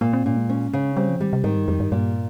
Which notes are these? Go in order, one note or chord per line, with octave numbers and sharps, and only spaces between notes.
A#2 A#3
C4
A#2 C#4
G#3
C#4
C#3
G3 C4
F3
D#3 G3
C3
G#2 D#3
G2
F2 G3
G2
G2 A#2